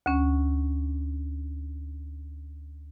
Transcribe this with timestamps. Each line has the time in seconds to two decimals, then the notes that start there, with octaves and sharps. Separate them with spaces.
0.06 D2 C#4